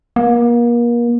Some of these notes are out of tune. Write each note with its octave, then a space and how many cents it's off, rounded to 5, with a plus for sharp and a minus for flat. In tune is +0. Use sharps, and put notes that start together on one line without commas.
A#3 +35